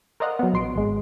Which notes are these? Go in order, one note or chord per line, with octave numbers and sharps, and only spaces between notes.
A#4 C5 D5 D#5 F5 F#5
F#3 B3
A#1 C6 D7
G#1 G#3